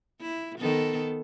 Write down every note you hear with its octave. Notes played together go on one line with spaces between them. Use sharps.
E4
D#3 B3 A4